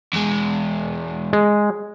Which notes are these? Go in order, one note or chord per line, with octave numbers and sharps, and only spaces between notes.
E2 G#3
G#3